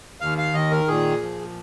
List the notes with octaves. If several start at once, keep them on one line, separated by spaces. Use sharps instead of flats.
D#2 F5
F5
D#3 D#5
A#4
A#2 G#4
F3